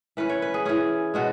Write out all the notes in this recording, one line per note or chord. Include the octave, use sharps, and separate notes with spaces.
E3 C#4 B4
C#5
B4
G#4
E3 C#4 G#4
B2 G#3 C#4 F#4